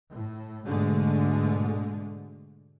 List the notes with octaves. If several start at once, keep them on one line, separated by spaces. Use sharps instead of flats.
A2
G#2 B2 D3 G#3 A3